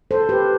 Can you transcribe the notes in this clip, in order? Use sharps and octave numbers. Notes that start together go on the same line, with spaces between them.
A4 C5
G4 B4